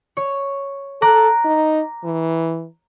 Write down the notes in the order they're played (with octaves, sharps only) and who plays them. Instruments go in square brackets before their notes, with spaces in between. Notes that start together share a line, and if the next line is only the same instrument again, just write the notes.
[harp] C#5
[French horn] A4 [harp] A#5 D6 F#6
[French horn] D#4
E3